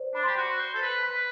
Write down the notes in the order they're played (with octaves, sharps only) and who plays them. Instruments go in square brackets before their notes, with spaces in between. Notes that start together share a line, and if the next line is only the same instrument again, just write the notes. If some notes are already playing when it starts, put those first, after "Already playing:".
Already playing: [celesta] C5 D5
[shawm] D4 [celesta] B5
[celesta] C6
[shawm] G4 [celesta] B5
[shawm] F#4
C5
A4
B4
[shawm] B4 [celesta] B5